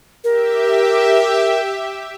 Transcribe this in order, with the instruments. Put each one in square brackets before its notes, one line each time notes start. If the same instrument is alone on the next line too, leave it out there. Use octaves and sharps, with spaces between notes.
[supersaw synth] G4 E5 [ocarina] A#4